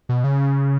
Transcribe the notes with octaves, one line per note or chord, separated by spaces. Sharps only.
B2
C#3